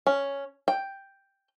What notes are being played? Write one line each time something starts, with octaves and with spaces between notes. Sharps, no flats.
C#4
G5